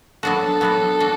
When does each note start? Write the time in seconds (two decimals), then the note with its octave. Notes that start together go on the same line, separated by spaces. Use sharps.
0.23 F#3 B3 D4 F#4 A4
0.61 F#3 B3 D4 F#4
1.00 D4 F#4